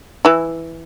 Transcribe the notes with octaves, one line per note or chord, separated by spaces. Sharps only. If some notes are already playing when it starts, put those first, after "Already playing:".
E3 E4